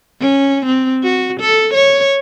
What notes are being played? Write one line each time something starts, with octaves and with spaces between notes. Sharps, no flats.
C#4
C4
F#4
A4
C#5